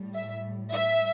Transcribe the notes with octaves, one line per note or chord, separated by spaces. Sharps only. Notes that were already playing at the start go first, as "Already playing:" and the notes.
Already playing: A2 G3
E5
E5